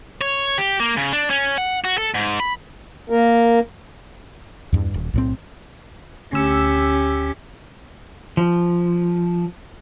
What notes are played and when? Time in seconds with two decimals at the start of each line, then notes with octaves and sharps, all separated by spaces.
0.21 C#5
0.58 G4
0.80 A#3
0.97 C#3
1.13 D4
1.30 C#4
1.58 F#5
1.84 F#4
1.98 A4
2.15 G#2
2.40 B5
3.10 A#3 A#4
4.72 E2 G2
4.94 D#1
5.13 B1 A2 C4
6.33 D2 C#4 G4 E6 C#7
8.37 F3